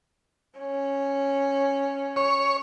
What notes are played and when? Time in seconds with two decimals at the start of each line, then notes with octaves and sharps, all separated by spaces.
0.59 C#4
2.16 C#5